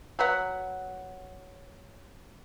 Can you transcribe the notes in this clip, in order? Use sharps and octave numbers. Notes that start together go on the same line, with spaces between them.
F#3 B4 F#5